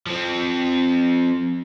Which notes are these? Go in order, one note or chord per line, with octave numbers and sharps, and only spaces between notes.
F3 C4